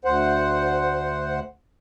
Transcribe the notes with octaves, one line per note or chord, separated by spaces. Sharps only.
D2 C5 F#5